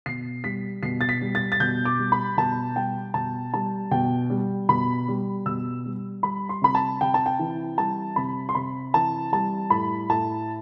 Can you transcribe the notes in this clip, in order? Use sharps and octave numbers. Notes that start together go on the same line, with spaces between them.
B2 C7
G3 B6
B2 C7
A6
B6
G3
A6
A6
B2 G6
D6
G3
B5
B2 A5
G3 G5
B2 A5
G3 A5
B2 G5
G3
B2 B5
G3
B2 E6
G3
G3 B5
C6
C3 B5
A5
C3 G5
A5
G5
E3
G3 A5
C3 B5
C6
C3 B5
E3 A5
G3 A5
A2 B5
A2 A5